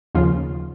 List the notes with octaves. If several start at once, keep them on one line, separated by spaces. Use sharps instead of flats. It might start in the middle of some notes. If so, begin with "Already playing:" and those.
D#2 C#3 F3 F4